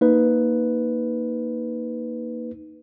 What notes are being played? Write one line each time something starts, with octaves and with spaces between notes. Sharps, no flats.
A#3 D#4 B4